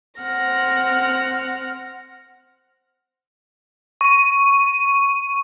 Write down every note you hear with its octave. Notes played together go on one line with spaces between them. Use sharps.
C4 F#5 F6 A#6
C#6 D#7